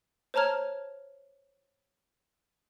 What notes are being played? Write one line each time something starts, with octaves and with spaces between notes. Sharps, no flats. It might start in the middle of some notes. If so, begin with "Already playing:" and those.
C5 C#5 A5 A#5 F6 G#6